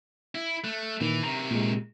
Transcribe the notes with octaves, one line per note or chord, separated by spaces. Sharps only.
E4
A3 F#6
A#2 D#3 E3
C3 D#3 A#5
A#2 G#3